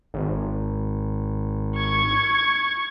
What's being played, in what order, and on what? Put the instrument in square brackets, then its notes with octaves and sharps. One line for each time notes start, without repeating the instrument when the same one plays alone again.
[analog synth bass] G#1
[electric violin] C#6 G#6